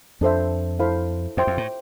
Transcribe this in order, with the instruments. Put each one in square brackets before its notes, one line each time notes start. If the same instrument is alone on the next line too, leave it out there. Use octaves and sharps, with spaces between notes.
[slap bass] F2 [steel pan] D4 A4 C5 E5
[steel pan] E4 A4 C5 F5 B5
[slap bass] F2 [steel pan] C5 E5 G5 C6
[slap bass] F2
A2